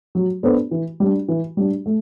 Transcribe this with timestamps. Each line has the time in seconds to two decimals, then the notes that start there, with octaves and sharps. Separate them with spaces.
0.15 F#3
0.43 B3 D4 A4 C5
0.71 E3
1.00 G3 D4
1.28 E3
1.57 G3 D4
1.86 A3